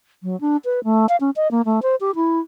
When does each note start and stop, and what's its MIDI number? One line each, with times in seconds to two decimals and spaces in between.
0.23 0.39 54
0.41 0.57 62
0.65 0.84 71
0.84 1.06 57
1.09 1.16 77
1.21 1.30 61
1.36 1.50 75
1.51 1.62 58
1.65 1.80 57
1.82 1.96 72
2.01 2.11 67
2.15 2.40 64